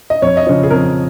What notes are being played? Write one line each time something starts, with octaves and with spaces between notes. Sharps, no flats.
D#5
F2 C#5
D#5
C#3 F3 C#5
G#4
F2 A#4